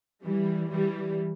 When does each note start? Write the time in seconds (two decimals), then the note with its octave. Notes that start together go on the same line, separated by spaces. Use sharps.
0.24 E3 G3
0.71 E3 G3